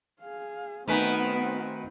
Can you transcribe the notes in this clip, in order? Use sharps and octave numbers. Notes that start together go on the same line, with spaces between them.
G#4 F5
D#3 A3 B3 C4 D#4 F#4 B4 G#5